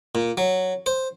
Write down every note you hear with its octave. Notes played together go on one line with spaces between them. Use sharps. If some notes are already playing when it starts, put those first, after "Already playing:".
A#2
F#3
C5